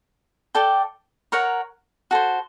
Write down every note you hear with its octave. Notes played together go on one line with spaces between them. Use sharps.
A4 D5 G5
A#4 C#5 F#5 A#5
F#4 A4 C5